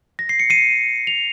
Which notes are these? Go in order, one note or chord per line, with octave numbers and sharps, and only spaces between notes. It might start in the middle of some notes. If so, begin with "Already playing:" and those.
A#6
C7
C#7
C7 D#7
F7